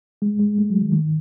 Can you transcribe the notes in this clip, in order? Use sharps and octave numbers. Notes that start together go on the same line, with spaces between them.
G#3
G#3
A3
F#3
D#3
D#3